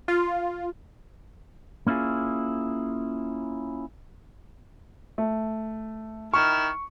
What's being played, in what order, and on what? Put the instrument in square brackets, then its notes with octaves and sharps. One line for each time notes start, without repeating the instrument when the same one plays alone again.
[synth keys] F4
[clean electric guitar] A#3 C#4 E4 F4 G#4
[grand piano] A3
[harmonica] D#3 E4 F6 [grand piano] C#6